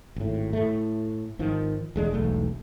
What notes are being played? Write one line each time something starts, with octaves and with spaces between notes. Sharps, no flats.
G#1 A2
A2 A3
G#1 D#3 F3
E1 G#3 D4
E1 B1 A3